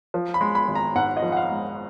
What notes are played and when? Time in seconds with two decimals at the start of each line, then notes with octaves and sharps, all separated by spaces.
0.14 F3
0.34 B5
0.41 G#3
0.55 B5
0.68 G#1
0.75 A#5
0.95 G#2 F#5
1.17 D#5
1.22 F3
1.32 F#5
1.37 F5
1.51 G#3